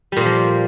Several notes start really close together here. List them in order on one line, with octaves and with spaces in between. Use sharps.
G3 A#2 A#3 F3